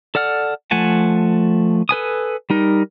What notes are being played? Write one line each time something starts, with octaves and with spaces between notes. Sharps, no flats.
A4 D5 F#5 F6
F3 A3 F#5 G#5 A5
A4 B4 G#5 D#6
G3 D#4 A#4